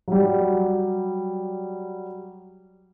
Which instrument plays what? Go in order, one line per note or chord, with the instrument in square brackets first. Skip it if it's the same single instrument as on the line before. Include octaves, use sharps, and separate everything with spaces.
[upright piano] F#3 G3